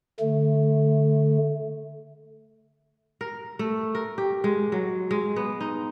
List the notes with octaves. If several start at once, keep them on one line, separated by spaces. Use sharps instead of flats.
D3 A3
A#4
A3
A#4
G4
G#3
F#3
G#3
B3
D#4